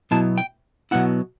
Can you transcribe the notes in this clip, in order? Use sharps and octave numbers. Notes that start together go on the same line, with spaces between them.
B2 F#3 B3 E4 A5
G5
B2 F#3 B3 E4 F#5